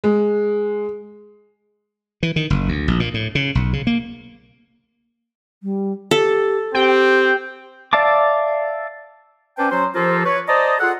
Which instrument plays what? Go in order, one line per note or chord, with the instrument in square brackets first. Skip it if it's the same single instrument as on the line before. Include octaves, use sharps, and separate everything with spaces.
[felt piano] G#3
[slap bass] E3
D#3
F#1
D2
A#1
A#2
A2
C#3
B1
C#3
A#3
[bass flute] G3
[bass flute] G4 [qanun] A4
[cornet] C4 [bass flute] G4 [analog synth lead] G5
[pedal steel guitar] D5 E5 F5 A5 D6
[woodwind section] C#4 B4 C5 D5 G5 A5
F#3 C#4 F#4 C5
F3 F4 G4 A4 A#4 C5
B4 C#5
C5 D5 D#5 A5 A#5 D#6
F4 G#4 A4 F#5